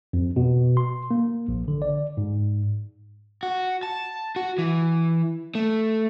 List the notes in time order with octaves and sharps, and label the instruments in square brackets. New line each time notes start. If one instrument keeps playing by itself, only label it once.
[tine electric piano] F2
B2
C6
A#3
A#1
D3
D5
G#2
[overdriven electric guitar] F#4
A5
F#4
E3
A3